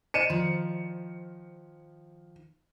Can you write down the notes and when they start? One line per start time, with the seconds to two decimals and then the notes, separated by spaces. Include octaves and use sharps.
0.14 C5 D5 D#5 C#7 D#7 E7
0.30 D#3 F3 C6